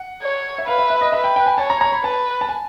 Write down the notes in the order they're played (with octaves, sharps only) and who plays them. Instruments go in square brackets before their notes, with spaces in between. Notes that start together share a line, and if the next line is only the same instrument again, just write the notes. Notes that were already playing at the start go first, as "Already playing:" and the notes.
Already playing: [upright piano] F#5
[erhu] C#5
[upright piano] E5
[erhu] B4 [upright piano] F5
[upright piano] E5
E5
D#5
[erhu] B4 [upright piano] E5
[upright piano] G5
G5
G#5
[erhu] C#5 [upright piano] A5
[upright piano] A#5
A#5
B5
[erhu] B4 [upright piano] A5
[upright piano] A5
G#5